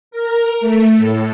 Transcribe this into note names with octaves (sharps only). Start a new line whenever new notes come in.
A#4
A3
A2